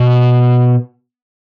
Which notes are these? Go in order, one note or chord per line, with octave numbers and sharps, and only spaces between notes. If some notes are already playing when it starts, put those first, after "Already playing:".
Already playing: B2